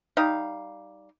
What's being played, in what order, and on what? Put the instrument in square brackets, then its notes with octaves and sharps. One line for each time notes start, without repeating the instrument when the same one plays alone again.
[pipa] G3 D#4 F5